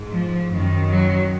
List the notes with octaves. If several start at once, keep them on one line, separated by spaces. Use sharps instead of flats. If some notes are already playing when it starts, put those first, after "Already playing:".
Already playing: G#2
F3
F#2 D#3
F#3